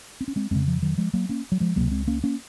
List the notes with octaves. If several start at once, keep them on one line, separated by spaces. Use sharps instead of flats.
C4
C#4
G#3 C4
F2 C#3 G#3 C4
F3
D#3 F#3
F3 G#3
F#3 A#3
A#3 C#4
F#3
F3 G#3
C#2 C3 F#3 A#3
G#3 C4
A#3 C#4
A#3 C#4